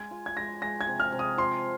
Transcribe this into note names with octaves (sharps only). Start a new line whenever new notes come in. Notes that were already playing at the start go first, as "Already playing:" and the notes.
Already playing: G#3 G#6
F4
G#6
G#3 A#6
G#3 A#6
G#6
C3
F6
C3
D#6
F3 C6